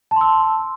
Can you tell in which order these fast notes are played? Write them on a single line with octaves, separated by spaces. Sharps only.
A5 C6 E6